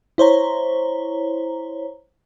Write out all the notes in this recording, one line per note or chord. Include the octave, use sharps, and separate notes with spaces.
E4 C5 C#5 A#5